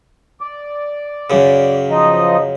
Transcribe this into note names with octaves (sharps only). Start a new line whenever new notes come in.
D5
F#2 C#3
F3 D#4 D#5